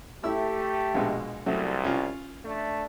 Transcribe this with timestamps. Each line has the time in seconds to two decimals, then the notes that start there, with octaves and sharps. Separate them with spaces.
0.24 A3 E4 G4 E6
0.94 A#1 B2 G#3
1.46 C2 F#3 A3 C4
1.84 C#4 F4
2.45 A3 D4